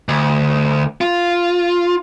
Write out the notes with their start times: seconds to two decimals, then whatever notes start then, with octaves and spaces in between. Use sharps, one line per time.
0.09 D2
1.01 F4